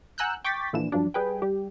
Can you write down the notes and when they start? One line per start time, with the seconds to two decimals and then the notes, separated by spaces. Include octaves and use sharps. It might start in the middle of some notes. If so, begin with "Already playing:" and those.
0.18 F#5 G#5 A#5 E6 F#6 G6
0.44 G5 C#6 D6 G6 A6 B6
0.73 A#2 D3 E3 F3 E7
0.92 G2 F3 F#3 D4
1.14 G3 G#4 B4 G5
1.42 G3 G4